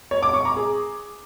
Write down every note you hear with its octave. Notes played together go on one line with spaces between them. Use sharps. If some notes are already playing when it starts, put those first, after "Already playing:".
C#5
D6
C#6
A#5
G#4